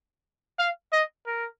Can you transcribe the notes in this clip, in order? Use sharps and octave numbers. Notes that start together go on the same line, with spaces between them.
F5
D#5
A#4